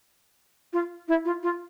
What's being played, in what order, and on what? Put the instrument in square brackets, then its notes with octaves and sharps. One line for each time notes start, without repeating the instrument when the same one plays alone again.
[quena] F4
E4
F4
F4